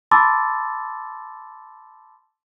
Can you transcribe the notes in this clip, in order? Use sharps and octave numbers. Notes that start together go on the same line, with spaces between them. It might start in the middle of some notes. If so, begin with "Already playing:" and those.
A5 B5 C6 D6 E6 A6